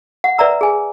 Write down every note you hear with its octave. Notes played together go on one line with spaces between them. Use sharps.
F#5
B4 D5 E5 A#5 E6
G#4 G#5